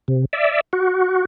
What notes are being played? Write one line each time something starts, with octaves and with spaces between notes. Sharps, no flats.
C3
D5 E5
F#4